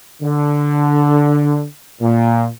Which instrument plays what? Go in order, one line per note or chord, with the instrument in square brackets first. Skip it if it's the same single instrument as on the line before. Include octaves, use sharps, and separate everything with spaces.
[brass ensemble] D3
A#2